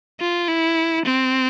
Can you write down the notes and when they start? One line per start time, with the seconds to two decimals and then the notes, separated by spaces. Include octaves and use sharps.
0.20 F4
0.48 E4
1.04 C4